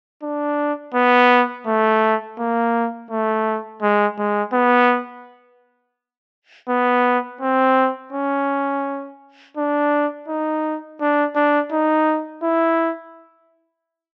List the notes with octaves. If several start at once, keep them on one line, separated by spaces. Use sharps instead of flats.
D4
B3
A3
A#3
A3
G#3
G#3
B3
B3
C4
C#4
D4
D#4
D4
D4
D#4
E4